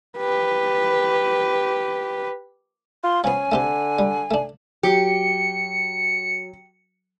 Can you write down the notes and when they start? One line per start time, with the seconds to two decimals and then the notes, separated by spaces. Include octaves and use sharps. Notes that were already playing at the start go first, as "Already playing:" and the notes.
0.18 G4 B4
3.04 F4 C6
3.24 F3 B3 C#4 G#5
3.52 D3 A3 C4 G4
3.99 G3
4.31 A3 D4
4.83 F#3 G4 C#7